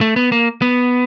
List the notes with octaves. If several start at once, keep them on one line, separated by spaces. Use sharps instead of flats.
A3
B3
A#3
B3